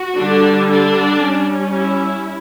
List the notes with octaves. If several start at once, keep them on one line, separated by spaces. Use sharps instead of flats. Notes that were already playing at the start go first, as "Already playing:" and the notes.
Already playing: F#4
D3 G3 D4
D4
G3 C#4
E4